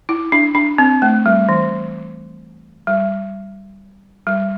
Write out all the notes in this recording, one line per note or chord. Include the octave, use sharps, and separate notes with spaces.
E4
D4
D4
C4
A3
G3
E3
G3
G3